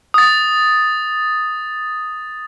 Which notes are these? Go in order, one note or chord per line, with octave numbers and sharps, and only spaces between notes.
D#6 A6